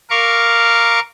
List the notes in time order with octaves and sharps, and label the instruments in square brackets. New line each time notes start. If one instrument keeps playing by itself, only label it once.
[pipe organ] A#4 F5 C#6 D6